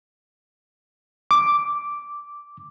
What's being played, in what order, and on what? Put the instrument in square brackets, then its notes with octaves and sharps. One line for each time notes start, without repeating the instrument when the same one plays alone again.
[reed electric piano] D6